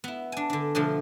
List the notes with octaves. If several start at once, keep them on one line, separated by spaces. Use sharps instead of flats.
B3 E4
D4 G#5
D3 D4
B2 D3 F3 A3